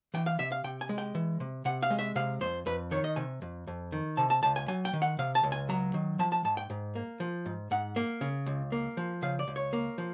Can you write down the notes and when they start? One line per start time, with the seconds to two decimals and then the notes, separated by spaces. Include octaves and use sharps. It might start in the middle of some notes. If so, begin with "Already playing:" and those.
0.14 E3 G5
0.26 F5
0.39 C3 E5
0.52 F5
0.64 C3 G5
0.81 G#5
0.89 G#3
0.98 G5
1.15 E3
1.40 C3
1.65 C3 F#5
1.83 F5
1.91 G#3
1.99 E5
2.16 C3 F5
2.41 F2 C5
2.66 F2 B4
2.91 D#3 C#5
3.04 D#5
3.16 C3 G#5
3.42 F2
3.67 F2
3.92 D#3
4.17 C3 A5
4.30 A5
4.43 C#2 A5
4.56 G#5
4.68 F#3 G#5
4.85 G5
4.93 D#3
5.02 F#5
5.19 C3 F5
5.35 A5
5.43 C#2
5.52 G#5
5.69 F#3 A#5
5.94 D#3
6.19 F3 A5
6.32 A5
6.45 G#2 A5
6.57 G5
6.70 G#2
6.95 A#3
7.20 F3
7.46 G#2
7.71 G#2 F#5
7.96 A#3
8.21 C#3
8.46 C#2
8.72 A#3
8.97 F3
9.22 C#3 F5
9.39 D5
9.48 C#2
9.56 C#5
9.73 A#3
9.98 F3